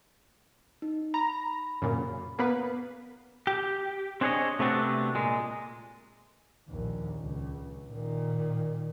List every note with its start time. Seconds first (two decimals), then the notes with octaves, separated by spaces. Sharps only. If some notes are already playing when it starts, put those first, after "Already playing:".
0.82 D#4
1.14 A#5 B5
1.82 F#2 A#2 C#3
2.39 A#3 B3 B4
3.47 G4
4.21 C4 D4 G#4 C5 C#5 D#5
4.59 C3 A3 B3 C4 D4 F#4
5.15 A#2 G#3
6.68 A#1 D#2
7.20 C#2
7.90 A#2 D#3